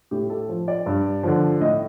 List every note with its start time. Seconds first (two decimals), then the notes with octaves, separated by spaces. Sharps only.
0.11 A2 G4
0.30 A4
0.49 F3
0.68 D5
0.86 G2
1.23 D3 F3
1.61 A2 D#5